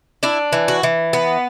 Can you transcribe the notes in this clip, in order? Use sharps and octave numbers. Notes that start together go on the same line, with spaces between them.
D4 E4
E3
F#4
E3
B3